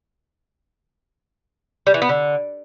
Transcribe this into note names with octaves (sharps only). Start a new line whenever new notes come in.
G3
E3
B3
D3